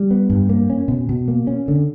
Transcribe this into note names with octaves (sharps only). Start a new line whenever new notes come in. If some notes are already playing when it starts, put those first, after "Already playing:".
Already playing: G3
B3
G2
A#3
C#4
B2
B2
A#3
C#4
D3